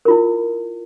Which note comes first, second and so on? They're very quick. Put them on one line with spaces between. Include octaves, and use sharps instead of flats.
A#4 F4 E4